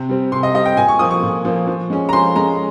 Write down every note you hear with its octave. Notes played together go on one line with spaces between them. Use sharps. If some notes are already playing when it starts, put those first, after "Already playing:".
Already playing: C3
G3 C4
C3 C6
D#5
G3 C4 D#5
G5
A#2 G#5
C#6
F3 A#3 D#6
C#6
A#2
F3 A#3
F3
G#3 C#4
A#5
F3 C6
G#3 C#4 A#5